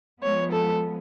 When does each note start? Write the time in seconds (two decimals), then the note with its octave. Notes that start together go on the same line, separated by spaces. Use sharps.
0.23 F3 G#3 B3 C#5
0.51 A4